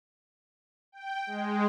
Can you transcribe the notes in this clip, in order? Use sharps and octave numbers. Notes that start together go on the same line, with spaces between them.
G5
G#3